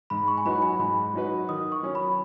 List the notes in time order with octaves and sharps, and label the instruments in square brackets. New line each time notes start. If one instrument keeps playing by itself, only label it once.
[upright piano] G#2 [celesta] B5
[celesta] C#6
G#5
[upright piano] F#3 D#4 F#4 B4 [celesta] B5
[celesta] G#5
[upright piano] G#2 [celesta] B5
[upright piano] F#3 D#4 F#4 B4
[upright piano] D#3 [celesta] D#6
[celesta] C#6
[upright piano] F#3 C#4
[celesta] B5